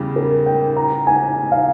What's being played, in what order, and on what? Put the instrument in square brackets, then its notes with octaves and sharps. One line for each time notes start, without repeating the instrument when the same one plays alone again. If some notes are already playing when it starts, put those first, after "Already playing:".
Already playing: [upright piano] E2 C#3 G3
[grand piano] A#4
G5
A#5
G#5
F5